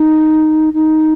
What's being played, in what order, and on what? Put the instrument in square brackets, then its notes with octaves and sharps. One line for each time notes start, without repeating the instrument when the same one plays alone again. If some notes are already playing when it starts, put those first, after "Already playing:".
Already playing: [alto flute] D#4
D#4